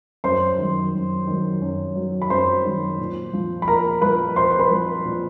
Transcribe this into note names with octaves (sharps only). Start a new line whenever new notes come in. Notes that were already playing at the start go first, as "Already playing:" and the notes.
F#2 C5 C6
D#3 F#3
F#2
D#3 F#3
F#2
D#3 F#3
B5
F#2 C5 C6
D#3 F#3
A#2
F3
B5
A#2 A#4 A#5
F3 B4 B5
A#2 C5 C6
C6
B4 B5
F3
A#2